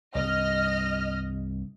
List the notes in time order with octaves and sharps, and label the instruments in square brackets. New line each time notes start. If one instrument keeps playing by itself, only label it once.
[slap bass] C2 G2 [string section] D#5 F6